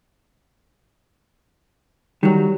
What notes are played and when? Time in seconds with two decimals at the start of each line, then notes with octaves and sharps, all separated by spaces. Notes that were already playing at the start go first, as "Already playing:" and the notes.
2.23 D#3 F#3 G3